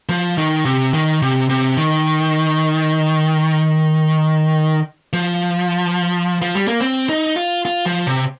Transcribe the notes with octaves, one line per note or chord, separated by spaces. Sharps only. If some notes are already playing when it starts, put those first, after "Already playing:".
F3
D#3
C3
D#3
C3
C3
D#3
F3
F3
G3
A#3
C4
D#4
F4
F4
F3
C3